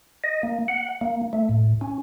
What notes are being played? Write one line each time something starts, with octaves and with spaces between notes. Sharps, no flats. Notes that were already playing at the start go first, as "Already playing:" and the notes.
D#5
A#3
F#5
A#3
A3
A2
C#4